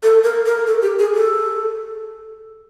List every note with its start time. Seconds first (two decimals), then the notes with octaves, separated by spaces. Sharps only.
0.03 A4
0.24 A#4
0.46 A#4
0.67 A4
0.82 G4
0.99 G#4
1.15 A4